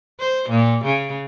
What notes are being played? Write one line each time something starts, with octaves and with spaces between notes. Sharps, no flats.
C5
A#2
C#3